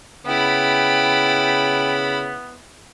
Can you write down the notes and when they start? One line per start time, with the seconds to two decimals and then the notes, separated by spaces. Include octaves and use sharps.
0.26 C#3 B3 E4 G5 B5